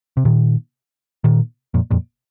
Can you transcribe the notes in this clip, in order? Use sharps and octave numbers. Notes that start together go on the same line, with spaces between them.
C3
A#2 D#3
A#2 D#3
F2 A#2
F2 A#2